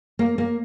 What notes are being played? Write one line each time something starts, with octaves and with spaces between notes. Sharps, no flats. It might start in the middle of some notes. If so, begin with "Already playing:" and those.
A#3
A#3